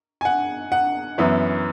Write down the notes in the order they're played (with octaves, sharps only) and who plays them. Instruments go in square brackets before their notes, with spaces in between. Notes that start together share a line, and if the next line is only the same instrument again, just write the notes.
[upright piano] G#5
F#5
F#5
F#2 E3 B3 E4